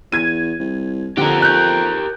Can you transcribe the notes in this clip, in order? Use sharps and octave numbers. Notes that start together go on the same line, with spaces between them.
E2 G#6 D#7
C2
F2 D3 G4 A#4
F#6 G6